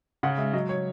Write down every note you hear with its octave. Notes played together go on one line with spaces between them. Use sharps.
C#3 F#5
G#3 E5
F#3 D#5
C#5